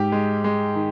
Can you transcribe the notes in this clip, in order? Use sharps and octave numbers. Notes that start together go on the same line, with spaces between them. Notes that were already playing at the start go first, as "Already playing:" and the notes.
Already playing: G#2 G4
G#3
G#3
D#3